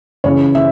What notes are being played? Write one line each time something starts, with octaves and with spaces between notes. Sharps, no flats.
C#2 C#3 E3 C#5
C#3 E3 E5